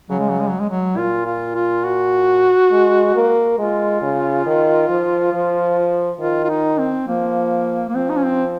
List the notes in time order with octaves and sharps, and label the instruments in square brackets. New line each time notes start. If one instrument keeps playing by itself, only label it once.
[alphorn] C#3 [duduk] F#3
[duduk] G#3
F#3
G#3
F#3
G#3
F#3
[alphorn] A#2 [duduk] F4
[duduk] F4
F4
F#4
[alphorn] G#3
A#3
[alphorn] G#3 [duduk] F4
[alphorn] C#3
D#3
F3
F3
[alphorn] D#3 [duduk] F4
[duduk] F4
D#4
C4
[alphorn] F3 [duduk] A#3
[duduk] A#3
[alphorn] F3 [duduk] C4
[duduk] D#4
C#4
C4